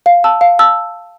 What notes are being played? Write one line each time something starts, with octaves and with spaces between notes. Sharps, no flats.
F5
A5 E6
F5
A5 E6